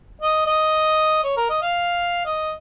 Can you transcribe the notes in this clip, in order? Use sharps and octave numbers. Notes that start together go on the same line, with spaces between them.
D#5
D#5
C#5
A#4
D#5
F5
D#5